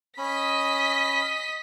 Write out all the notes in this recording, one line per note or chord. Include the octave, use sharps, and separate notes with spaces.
C#4 D#5 B5 B6